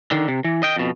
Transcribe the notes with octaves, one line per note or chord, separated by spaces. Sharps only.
D3 D#3
C3
E3
D#5 G5
F2 B2